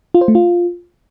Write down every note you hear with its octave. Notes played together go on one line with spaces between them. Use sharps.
F4
C5
A3
F4